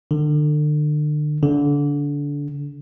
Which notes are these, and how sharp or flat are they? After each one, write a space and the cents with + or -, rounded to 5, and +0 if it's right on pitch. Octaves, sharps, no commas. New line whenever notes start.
D3 +35
D3 -25